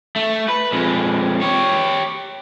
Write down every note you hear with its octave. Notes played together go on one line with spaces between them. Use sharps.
A3
B4
F2 G#3
G4 C#5